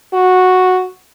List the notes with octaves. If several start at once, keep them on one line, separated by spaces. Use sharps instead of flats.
F#4